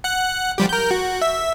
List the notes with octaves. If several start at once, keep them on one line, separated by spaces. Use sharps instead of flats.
F#5 F#6
F3 G3 G4
A#4 G6
F#4
E5